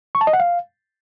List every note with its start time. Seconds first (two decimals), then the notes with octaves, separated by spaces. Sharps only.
0.15 C#6
0.21 A5
0.27 D#5
0.33 F#5
0.40 F5